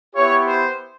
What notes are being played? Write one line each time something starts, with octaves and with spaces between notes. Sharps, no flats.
B3 E4 G4 C#5
C5